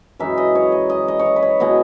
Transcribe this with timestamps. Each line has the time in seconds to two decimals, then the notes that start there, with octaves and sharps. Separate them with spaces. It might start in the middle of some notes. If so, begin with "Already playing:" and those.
0.19 F#2 E3 G#3 D#4 E5
0.38 D#5
0.55 C#5
0.72 D#5
0.90 D#5
1.08 D#5
1.19 C#5
1.26 D#5
1.36 B4
1.43 C#5
1.60 B2 G#3 B3 E4 D#5